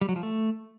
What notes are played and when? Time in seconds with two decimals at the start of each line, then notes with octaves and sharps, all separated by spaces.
0.01 G3
0.09 F#3
0.16 F3
0.23 A3